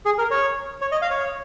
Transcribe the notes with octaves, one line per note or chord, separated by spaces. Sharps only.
G#4
A#4
C#5
C#5
D#5
F5
C#5